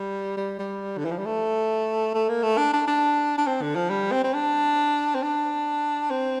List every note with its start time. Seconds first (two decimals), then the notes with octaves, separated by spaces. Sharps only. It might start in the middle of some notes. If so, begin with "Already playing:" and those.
Already playing: G3
0.37 G3
0.59 G3
0.98 D3
1.05 E3
1.11 F3
1.18 G3
1.26 A3
2.15 A3
2.29 A#3
2.43 A3
2.58 D4
2.74 D4
2.88 D4
3.38 D4
3.47 C4
3.62 D3
3.76 F3
3.90 G3
4.12 C4
4.24 C4
4.34 D4
5.15 C4
5.23 D4
6.11 C4